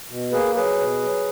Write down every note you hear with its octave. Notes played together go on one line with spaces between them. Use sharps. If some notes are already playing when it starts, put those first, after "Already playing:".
B2
A#3 G#4 B4
F#3 G#4 B4
B2
F#3